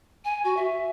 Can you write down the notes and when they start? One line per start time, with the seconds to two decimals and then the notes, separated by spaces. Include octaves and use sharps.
0.25 G#5
0.44 F#4
0.57 E5